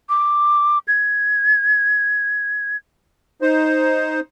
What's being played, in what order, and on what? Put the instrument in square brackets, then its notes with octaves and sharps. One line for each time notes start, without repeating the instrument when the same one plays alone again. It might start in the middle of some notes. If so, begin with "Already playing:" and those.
[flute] D6
G#6
[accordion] D#4 C5